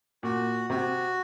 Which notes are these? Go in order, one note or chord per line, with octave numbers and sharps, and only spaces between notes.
A#2 F#4
C3 F#4